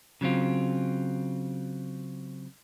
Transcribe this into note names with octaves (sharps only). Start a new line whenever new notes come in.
C#3 F#3 C4 F4